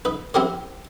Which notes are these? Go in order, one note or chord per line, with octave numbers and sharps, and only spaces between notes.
D#4 B4
C4 E4 G4 A#4 C#5